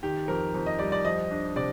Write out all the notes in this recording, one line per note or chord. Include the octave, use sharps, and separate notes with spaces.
D#3 G4
F2 A#4
F2
D#5
G3 D5
D5
F3 D#5
D4
C3 D5